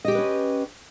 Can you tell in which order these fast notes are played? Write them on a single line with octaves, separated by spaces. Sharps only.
D#5 G4 G#4 B4 C#4